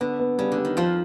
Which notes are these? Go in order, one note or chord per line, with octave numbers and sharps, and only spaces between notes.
D3 B3
B3
C#3 G3
D3
G3
D#3
F2 F3 F4